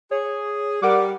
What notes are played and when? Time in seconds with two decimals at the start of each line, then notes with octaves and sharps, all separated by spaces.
0.11 G#4 C#5
0.82 G3 A#4 F#5 D6